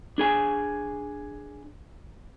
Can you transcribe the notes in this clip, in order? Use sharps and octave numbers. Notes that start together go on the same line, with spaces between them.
D4 G#4 G#5